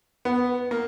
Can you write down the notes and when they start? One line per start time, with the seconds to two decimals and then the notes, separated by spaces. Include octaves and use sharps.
0.25 B3
0.71 A#3